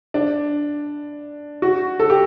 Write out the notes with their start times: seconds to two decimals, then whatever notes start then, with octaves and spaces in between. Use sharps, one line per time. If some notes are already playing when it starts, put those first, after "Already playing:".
0.14 D4
1.62 F#4
2.00 A4
2.10 G4